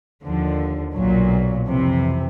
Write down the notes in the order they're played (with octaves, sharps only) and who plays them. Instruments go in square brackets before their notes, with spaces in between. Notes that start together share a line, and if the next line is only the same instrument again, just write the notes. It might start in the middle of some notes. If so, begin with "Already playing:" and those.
[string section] D#2 D3 F3
B1 A#2 F#3
F2 C3 E3